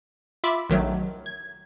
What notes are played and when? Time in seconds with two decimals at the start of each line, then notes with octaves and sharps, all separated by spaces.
0.44 F4 E5 B5 D6
0.69 A#1 D#3 F#3 A3
1.26 G#6